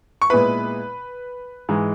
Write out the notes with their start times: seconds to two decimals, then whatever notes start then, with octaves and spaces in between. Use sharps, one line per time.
0.22 C#6
0.30 A#2 G#3 B3 E4 B4 B5
1.69 G#2 E3 G#3